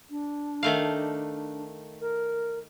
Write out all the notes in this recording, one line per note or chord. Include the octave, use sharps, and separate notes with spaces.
D4
D#3 A3 F5
A#4